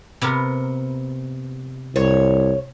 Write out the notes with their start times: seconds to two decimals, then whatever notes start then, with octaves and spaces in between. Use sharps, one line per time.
0.21 C3 B3 A#4
1.96 C2 C#5